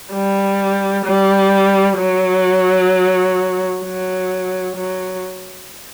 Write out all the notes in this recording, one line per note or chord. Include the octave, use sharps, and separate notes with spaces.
G3
G3
F#3
F#3
F#3